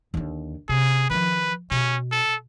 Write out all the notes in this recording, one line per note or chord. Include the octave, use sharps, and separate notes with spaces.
D#2 D3
C3 G#4
D#3 F3 B4
B2 C#4
A4